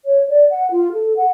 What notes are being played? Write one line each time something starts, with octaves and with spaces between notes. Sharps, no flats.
C#5
D5
F#5
F4
A4
F#5